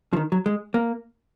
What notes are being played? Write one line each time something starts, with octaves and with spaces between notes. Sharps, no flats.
F3
D#3
F#3
G#3
A#3